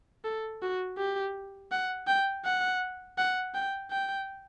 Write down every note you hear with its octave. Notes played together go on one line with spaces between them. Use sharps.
A4
F#4
G4
F#5
G5
F#5
F#5
G5
G5